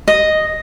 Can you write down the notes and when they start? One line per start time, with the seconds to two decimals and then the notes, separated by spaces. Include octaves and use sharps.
0.08 D#5